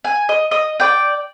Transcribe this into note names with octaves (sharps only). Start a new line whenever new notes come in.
G#5
D#5
D#5
D5 G5